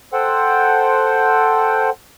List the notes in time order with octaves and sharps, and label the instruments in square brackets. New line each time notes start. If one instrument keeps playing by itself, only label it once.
[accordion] A4 C5 F#5 G5